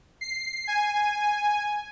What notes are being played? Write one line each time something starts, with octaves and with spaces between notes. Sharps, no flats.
C7
G#5